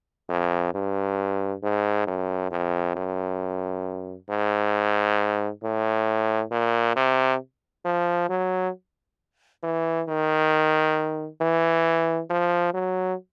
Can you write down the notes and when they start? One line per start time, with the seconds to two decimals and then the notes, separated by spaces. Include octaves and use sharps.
0.30 F2
0.74 G2
1.63 G#2
2.07 F#2
2.51 F2
2.96 F#2
4.29 G#2
5.63 A2
6.51 A#2
6.96 C3
7.85 F3
8.29 F#3
9.63 E3
10.08 D#3
11.41 E3
12.30 F3
12.74 F#3